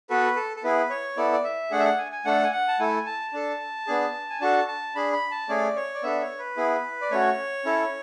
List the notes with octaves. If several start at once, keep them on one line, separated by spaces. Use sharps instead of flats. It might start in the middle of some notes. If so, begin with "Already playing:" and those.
B3 F#4 A4 B4
A4
A4
B3 E4 G#4 B4
C#5
B3 E4 A4 D5
D5
E5
A3 D4 G#4 F#5
E5
F#5
G#5
G#5
A3 D4 A4 F#5
G#5
F#5
A5
A3 E4 A4 G#5
A5
D4 A4
B3 D4 G#4
G#5
D4 F#4 A4 A5
A5
D4 G#4 B5
B5
A5
A3 C#4 G#4 D5
C#5
D5
B3 D4 A4 E5
C#5
B4
B3 E4 G#4
D5
A3 C#4 F#4 C#5
C#4 E4 A4